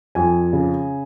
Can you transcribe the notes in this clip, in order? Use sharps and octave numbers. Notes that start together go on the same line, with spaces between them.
F2 G#5
C#3